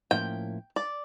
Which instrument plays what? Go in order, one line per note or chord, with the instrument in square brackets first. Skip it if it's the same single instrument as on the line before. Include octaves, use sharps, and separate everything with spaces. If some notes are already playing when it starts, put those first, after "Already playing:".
[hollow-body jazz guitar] A2 F3 A#3 C#4 E4 [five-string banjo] G5
[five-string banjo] D5